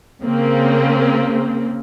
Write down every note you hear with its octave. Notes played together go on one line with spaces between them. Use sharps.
C#3 A#3 C4